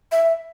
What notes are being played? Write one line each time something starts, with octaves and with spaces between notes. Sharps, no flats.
E5